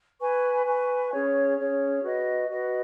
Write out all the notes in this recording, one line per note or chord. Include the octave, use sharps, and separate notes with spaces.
B4 G#5 C#6
B4 G#5 C#6
C#4 G#4 C#5
C#4 G#4 C#5
F#4 B4 D#5
F#4 B4 D#5